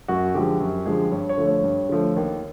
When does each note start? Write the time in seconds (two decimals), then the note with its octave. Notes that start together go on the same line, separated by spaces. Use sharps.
0.08 F#2 F#4
0.35 D3 F3 G#3 G4
0.60 F#2
0.86 D3 F3 G#3
1.12 G2 C#5
1.29 C#5
1.37 D3 F3 A3
1.47 C#5
1.64 G2
1.89 D3 F3 A3
2.16 D#2